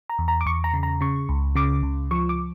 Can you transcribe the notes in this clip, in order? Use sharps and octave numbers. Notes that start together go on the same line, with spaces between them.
A#5
E2
A#5
D6
E2 C#6
A#5
C#3
A#5
C#3 C#6
C#2
C#3 D6
C#2
F3 C#6
D6